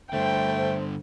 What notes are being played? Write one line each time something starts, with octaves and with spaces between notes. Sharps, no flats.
G2 D3 A3 C5 G5